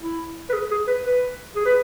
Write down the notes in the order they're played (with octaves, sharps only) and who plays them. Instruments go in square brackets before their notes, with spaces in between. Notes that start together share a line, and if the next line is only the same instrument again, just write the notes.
[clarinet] E4
B4
G#4
G#4
B4
B4
G#4
B4